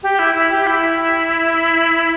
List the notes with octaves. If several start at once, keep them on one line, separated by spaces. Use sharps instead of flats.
G4
E4
E4
G4
E4